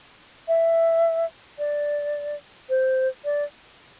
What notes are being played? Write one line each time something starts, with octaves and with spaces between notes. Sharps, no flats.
E5
D5
C5
D5